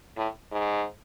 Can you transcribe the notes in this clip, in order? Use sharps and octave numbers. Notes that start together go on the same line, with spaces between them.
A2
G#2